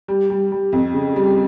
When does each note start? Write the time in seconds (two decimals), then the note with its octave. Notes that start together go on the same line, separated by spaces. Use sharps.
0.08 G3
0.30 G3
0.52 G3
0.73 F2
0.94 C#3
1.16 G3